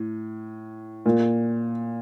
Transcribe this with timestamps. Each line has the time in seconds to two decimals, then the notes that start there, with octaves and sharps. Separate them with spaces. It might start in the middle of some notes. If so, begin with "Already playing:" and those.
Already playing: A2
1.06 A#2